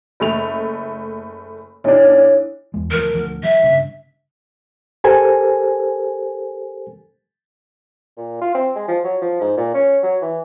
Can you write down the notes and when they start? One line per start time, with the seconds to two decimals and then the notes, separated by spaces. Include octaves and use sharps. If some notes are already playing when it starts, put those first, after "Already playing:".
0.20 F#1 A3 F7
1.84 B1 D4 E4 C#5
2.74 E2 G#3
2.92 D2 F3 A#4
3.14 D2 F3
3.44 F#3 E5
3.63 G2 C#3
5.04 G4 A4 A#4 C5 G#5
8.17 A#2
8.41 F4
8.55 C4
8.76 G#3
8.88 F3
9.04 F#3
9.22 F3
9.41 G#2
9.57 A#2
9.74 C#4
10.03 F#3
10.22 E3